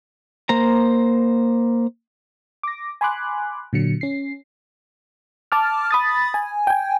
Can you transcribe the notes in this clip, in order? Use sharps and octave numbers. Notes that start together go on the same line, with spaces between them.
A#3 C5 A#5
D6 A#6
G#5 B5 C6 D6 F#6
A#2 D3 F#3 C#7
C#4 C7
A5 D6 F6
B5 D#6 A6
G#5
G5 G#5